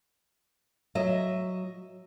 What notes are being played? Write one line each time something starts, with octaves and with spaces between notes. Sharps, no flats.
F#3 D#5 E5